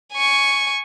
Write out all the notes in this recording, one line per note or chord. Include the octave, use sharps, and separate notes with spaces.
G#5 C#6